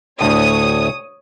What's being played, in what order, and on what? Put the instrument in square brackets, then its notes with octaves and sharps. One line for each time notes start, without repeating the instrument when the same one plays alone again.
[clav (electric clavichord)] D2 A2 D3 [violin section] C#5 D#6